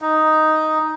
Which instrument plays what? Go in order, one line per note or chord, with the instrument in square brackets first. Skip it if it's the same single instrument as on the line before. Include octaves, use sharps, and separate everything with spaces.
[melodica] D#4